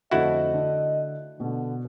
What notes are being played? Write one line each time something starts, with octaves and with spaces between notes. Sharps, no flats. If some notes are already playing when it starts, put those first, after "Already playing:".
F2 D3 A3 E4 F#4 D#5 F#6
D3
B2 D3